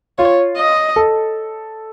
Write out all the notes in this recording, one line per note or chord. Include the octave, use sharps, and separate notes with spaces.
F4 C#5
D#5
A4